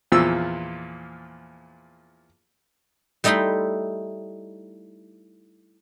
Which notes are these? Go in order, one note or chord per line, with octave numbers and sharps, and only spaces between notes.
E2 A#2 F3 F4 E6
G3 A3 D#4 E4 B5 C6